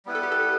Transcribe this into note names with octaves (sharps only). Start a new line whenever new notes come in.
G3 B3 E4 B4
A4
G4
A4